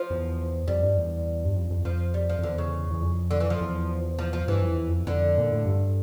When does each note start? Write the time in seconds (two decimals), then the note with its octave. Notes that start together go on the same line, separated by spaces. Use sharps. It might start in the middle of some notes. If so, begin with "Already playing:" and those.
Already playing: F3
0.10 E2
0.68 F2 G3
0.83 G2
0.97 E2
1.45 G2
1.56 F2
1.71 F2
1.85 F2 F3
2.14 G3
2.29 F3
2.39 F2
2.43 E2 D3
2.58 C#3
2.90 E2
3.01 F2
3.31 D3
3.40 E3
3.50 F3
3.61 E2
4.19 F3
4.33 F3
4.48 G2 E3
4.62 F2
4.74 E2
4.88 F2
5.07 F2 D3
5.38 A#2
5.52 A2
5.65 G2